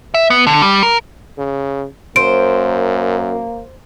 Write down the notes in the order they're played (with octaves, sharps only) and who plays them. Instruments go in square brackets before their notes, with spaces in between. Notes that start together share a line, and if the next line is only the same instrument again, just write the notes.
[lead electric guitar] E5
B3
D3
G3
A#4
[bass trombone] C#3
[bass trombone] F#2 [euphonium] A#3 [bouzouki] C5 [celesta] D7